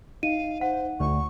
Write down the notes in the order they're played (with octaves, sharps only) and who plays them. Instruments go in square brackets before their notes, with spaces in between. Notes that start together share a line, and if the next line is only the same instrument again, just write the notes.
[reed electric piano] D#4 [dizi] F5 [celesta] D#7
[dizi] C5 [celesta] F#5
[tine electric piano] D2 [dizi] C#6